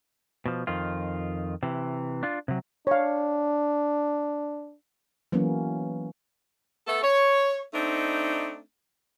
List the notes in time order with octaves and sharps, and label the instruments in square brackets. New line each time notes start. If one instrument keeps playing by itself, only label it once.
[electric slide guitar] B2 F3
F2 D#3 F4
C3 E3
D4 F4
C3 F#3
[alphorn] D4 [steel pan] C#5 F5
[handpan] E3 F#3 A#3 B3 C#4
[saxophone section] A3 B3 A4
C#5
A3 C4 D4 D#4